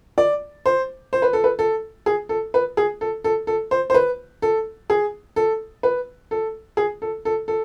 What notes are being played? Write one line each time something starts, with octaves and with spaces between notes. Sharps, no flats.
D5
C5
C5
B4
A4
B4
A4
G#4
A4
B4
G#4
A4
A4
A4
C5
C5
B4
A4
G#4
A4
B4
A4
G#4
A4
A4
A4